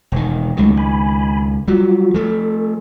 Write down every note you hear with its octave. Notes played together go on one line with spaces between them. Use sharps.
E1 D#3
C#2 D#3 F#3 G#3 A3
G#5 B5
F#3 G3 F4 F#4
F3 A3 A4